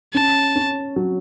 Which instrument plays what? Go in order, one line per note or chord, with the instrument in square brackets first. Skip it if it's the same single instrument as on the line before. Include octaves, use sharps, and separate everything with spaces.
[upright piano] C#4 [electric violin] A5
[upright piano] C#4
F#3